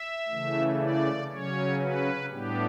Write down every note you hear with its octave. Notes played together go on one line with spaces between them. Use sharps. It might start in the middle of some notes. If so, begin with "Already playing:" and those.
Already playing: E5
C#3 E3 A3
D5
C#3 F#3 C#4 C#5
B4
A2 G3 B3 D4 G4